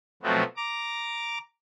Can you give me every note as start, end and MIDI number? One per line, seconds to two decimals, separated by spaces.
0.23 0.43 47
0.23 0.43 53
0.23 0.43 54
0.23 0.43 57
0.23 0.43 59
0.23 0.43 60
0.56 1.38 82
0.56 1.38 86